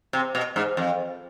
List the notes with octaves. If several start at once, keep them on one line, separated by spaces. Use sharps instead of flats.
C3
B2
G#2
F2